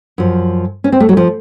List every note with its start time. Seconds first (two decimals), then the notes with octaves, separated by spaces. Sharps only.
0.18 F#2 F3
0.84 C#4
0.92 C4
1.00 A3
1.09 F#3
1.17 F3